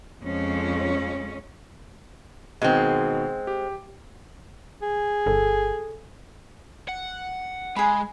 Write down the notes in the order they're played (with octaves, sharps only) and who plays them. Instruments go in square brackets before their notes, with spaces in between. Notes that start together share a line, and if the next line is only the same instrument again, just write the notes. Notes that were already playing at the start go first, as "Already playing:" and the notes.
[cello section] F2 G#3 C#4
[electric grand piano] B2 D#3 [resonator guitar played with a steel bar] G#3 C4
[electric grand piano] G4
[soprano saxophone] G#4
[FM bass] G1 [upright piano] A4
[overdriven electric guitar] F#5
[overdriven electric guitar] G#3 [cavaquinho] G#4 B5